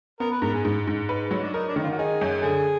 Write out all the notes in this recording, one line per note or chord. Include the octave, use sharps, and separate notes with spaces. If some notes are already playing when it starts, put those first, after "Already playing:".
B3 A#4
B4
G#2 A#4
G#4
G#2
G#2
B4
F#3
D4
D#4 A#4
D4
D#3 D#4
F4
F#4
D#4 G#4
F#2
D3 G#4